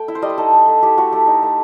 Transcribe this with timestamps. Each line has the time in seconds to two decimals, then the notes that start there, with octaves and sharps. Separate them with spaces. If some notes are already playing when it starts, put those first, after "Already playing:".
Already playing: A3 G5
0.08 E4
0.15 C5
0.22 G3 D#5
0.30 C5
0.38 D#4 A4
0.53 A3
0.68 A3
0.82 E4 G4
0.98 A3 F#4
1.12 A3 G4
1.27 D#4
1.43 A3